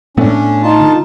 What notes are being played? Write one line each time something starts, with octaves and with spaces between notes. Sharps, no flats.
A2 A3 B3 C#4 D4
D#4 F4 A5
D3